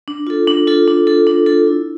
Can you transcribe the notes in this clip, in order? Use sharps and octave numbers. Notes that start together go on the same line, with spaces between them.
D4
F4 A4
D4
F4 A4
D4
F4 A4
D4
F4 A4
E4